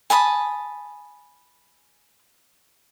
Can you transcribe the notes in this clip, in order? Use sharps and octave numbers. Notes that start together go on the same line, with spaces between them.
G#5 A5 B5 D#6